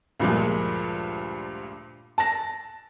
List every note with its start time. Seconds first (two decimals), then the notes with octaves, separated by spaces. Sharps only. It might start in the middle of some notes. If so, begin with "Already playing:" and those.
0.20 D2 G2 A#2 F3 G#3
2.18 A5 A#6